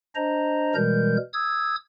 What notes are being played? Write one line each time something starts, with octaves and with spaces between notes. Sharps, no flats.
D4 C5 D#5 A#5
B2 E3 G3 G#3 A#4 G6
D#6 E6 G#6